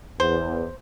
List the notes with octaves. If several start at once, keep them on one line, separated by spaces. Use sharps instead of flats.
E2 C5